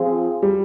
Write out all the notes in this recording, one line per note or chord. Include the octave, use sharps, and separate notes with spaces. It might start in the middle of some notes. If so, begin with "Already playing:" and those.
Already playing: F3 C4 F4 G#4
G3